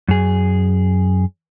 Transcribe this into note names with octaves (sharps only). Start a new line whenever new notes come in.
F#2 G#4